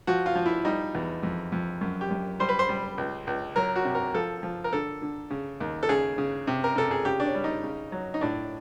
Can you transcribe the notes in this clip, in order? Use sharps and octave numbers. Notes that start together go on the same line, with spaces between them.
F3 F#4
F4
F3
E4
G3 D#4
E2
F2
F2
F#2
G4
F#2
G3 C5
B4
C5
G3
C#2
C#2
F#3 A#4
F#4
C3
A#4
F3 A4
F3
A#4
D3 A4
D3
C#3
D#2
A4
C#3 G#4
C#3
C3
A#4
C3 A4
G#4
C#3 G4
D4
C#4
G3
D#4
C#3
F#3
D#4
A2 D4